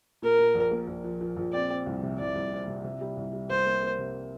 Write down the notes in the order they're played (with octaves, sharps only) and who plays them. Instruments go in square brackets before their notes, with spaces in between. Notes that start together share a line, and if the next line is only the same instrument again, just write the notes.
[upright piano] A#2 [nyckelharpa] A#4
[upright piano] A#2
A#1
A#3
A#1
F3
F3
A#1
[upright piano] C4 [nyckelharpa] D5
[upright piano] C4
C2
C3
[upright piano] C2 [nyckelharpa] D5
[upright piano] C2
C4
C3
C3
G3
C2
G3
[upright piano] C2 [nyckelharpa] C5
[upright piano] A#3
A#3
C3